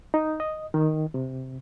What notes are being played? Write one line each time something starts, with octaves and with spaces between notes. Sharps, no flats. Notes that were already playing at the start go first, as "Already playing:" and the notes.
D#4
D#5
D#3
C3